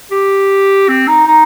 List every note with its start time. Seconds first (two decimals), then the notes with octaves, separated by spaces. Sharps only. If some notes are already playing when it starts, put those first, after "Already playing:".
0.12 G4
0.89 C4
1.08 D#4
1.27 D#4